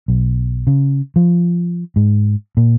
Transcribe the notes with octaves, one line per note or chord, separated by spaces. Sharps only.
B1
C#3
F3
G#2
A#2